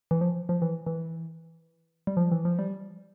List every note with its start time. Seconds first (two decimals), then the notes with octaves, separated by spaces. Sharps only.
0.11 E3
0.21 F3
0.49 F3
0.62 E3
0.87 E3
2.07 G3
2.17 F3
2.32 E3
2.45 F3
2.59 G3